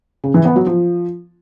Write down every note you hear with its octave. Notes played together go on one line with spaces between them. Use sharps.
C#3
E3
B3
F#3
F3